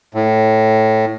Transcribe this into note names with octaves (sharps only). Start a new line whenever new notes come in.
A2